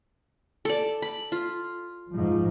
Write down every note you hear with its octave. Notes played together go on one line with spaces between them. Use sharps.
A4 D5
B5
F4
G#2 F3